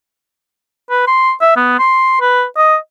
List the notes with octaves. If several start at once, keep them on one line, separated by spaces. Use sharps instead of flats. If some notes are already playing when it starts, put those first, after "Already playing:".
B4
C6
E5
B3
C6
B4
D#5